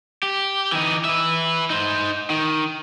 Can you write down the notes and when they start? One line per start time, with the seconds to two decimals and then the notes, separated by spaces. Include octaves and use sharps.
0.23 G4
0.72 E3 D#4
1.05 B4 E5
1.70 D#4 C5
2.30 D#3